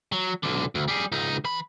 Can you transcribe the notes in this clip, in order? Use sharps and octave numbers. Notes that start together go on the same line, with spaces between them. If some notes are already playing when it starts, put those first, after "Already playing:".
F#3
B1 D3
D2
G3 G#4
C#2 D#4
E3 B5